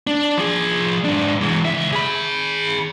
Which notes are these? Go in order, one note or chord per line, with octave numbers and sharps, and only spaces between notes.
D4
F3 G#4
G#2 D4
E3 G#3
C#2 E5
G#4 B5